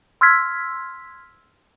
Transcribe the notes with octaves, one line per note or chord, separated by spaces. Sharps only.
C6 E6 F6 G#6 B6